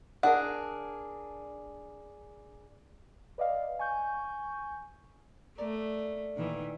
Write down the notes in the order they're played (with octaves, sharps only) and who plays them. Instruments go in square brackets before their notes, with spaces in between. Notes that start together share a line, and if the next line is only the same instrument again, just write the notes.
[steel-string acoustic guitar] D4 G#4 A#4 [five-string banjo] F#5
[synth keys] B4 D5 D#5 F5
G#5 C#6 G6
[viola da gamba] A3 [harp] A#4 D5
[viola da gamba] A#2 D#3 E3